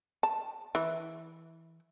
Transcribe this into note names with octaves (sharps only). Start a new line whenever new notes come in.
A5
E3